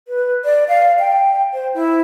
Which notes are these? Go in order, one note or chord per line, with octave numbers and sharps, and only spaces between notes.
B4
D5
F5
G5
C5
E4